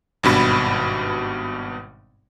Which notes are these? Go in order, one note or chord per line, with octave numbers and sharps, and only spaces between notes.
G#1 G2 B2 B5